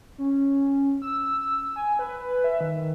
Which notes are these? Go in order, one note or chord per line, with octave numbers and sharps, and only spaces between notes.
C#4
E6
G#5
B4
E5
D#3